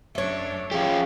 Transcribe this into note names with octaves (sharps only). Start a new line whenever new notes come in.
F#2 A3 D4 C#5
F3 C#4 G4 G#4 F5